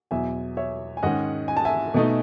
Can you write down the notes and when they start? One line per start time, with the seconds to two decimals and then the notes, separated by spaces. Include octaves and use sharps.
0.11 E2 B2 F#3 E5 G#5
0.57 C#5 E5
0.97 G#5
1.03 G#2 D#3 G#3 C#4 D#5 F#5
1.48 G#5
1.57 A5
1.65 E5 G#5
1.94 B2 A3 D#4